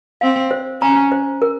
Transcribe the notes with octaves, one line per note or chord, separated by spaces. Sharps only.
C4 F5
C5
C#4 A#5
C5
A#4